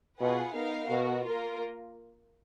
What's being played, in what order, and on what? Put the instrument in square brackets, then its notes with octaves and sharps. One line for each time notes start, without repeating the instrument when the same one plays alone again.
[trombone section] B2 [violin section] F4 G#4 B4 F#5
[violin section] B3 D#4 A#4 F5
[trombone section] B2 [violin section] B3 F#4 A#4
[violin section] A#3 F4 A#4